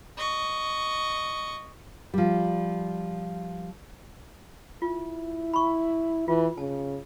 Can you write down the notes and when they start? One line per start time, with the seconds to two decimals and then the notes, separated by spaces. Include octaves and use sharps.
0.18 D#5 C#6
2.14 F3 G3
4.82 E4 F4
5.54 B5 C#6
6.28 E3 F4
6.58 C#3 A5